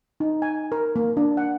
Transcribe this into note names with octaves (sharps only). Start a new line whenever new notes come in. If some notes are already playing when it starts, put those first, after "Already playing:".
D#4
G#5
A#4
A#3
D4
F#5